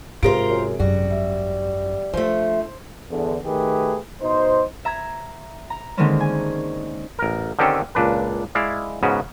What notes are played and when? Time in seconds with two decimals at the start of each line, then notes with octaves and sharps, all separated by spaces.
0.23 G#2 C3 F4 G#4 A#4 C5 D7
0.49 F#2
0.79 G#1 F#2 G3 F#4
1.10 E5
2.13 F3 A3 D4 C5
3.10 E2 D3
3.45 D#3 A3 G4 G#4 B4
4.22 B2 D#4 C5
4.85 E5 A#5 E6 G#6
5.70 A#5
5.97 D3 D#3 G#3 A#3 C4 C#4
6.20 G#5
7.19 A1 A#4
7.59 D3 D#3 C4 C#4 G4 A4
7.95 C#2 A#2 D4 B4
8.55 G#3 E4 D5 F5
9.03 G#2 C#3 B3 C#4 F#4